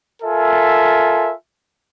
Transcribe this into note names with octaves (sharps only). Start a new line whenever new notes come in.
F4 A4 A#4 E5 G#5